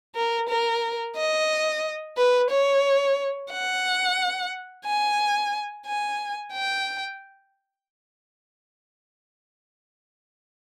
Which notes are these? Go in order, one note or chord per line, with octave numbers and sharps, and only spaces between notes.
A#4
A#4
D#5
B4
C#5
F#5
G#5
G#5
G5